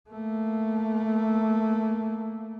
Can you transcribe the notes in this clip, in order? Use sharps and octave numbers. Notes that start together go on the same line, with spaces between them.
A3 A#3